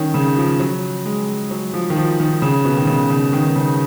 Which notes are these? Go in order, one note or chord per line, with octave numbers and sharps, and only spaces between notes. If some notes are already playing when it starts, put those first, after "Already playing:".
Already playing: D#3 C#4
C#3
F3
F#3
G#3
F#3
F3
D#3
F3
D#3
C#3
B2
D#3
C#3
C#3
D#3
C#3